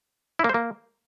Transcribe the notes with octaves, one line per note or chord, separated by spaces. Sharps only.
E4
A#3
C5
A#3